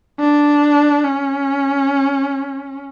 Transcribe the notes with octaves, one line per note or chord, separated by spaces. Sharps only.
D4
C#4